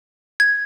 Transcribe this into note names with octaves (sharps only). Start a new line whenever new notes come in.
G#6